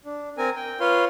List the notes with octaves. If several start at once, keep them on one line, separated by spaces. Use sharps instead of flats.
D4
C4 A#4 G#5
G5
F4 B4 C#5 F5 C6